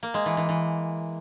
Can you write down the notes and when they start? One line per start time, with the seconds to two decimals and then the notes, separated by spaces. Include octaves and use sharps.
0.03 A#3
0.14 G#3
0.26 E3
0.37 E3
0.49 E3